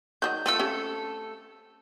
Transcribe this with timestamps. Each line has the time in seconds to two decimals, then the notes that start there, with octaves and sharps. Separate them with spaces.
0.22 D#3 F#3 D#5 G6
0.46 A3 C4 F4 A4 E6
0.59 C4 C#4 G4